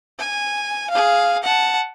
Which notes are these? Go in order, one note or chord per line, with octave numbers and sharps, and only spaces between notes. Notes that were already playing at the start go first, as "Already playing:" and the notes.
G#5
G#4 F5
F#5 A5